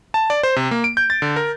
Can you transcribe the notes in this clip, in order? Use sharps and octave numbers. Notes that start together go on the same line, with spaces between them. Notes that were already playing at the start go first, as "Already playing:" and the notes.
A5
D5
C5
C3
A#3
D7
G6
A6
D3
A#4